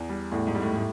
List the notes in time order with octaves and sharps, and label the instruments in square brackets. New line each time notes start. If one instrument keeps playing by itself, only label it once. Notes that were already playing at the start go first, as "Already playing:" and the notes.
Already playing: [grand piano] E2
G3
[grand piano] E2 [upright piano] A2
[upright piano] G#2
[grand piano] G3
[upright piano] A2
A2